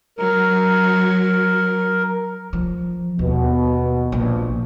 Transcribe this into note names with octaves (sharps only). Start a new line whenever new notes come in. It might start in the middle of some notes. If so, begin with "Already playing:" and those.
F#3 A#4
F3
D#2 B2
A#1